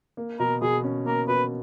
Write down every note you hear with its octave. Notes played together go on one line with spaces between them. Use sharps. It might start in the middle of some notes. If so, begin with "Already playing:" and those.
A#3
B2 A#4
B2 G#4
C#4
A#3 A#4
B2 B4